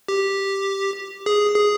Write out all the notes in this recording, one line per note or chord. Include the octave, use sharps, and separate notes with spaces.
G4
G#4
G#4